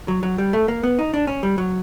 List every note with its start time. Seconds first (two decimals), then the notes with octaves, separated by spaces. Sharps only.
0.08 F#3
0.23 F#3
0.38 G3
0.53 A3
0.68 A#3
0.84 B3
0.99 D#4
1.14 D4
1.27 C#4
1.43 G3
1.58 F#3